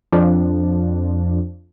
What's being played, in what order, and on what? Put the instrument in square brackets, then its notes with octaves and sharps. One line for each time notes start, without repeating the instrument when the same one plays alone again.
[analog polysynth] F2 F3 D4